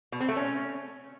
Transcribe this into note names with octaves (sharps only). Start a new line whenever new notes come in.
B2
C4
A3
C#4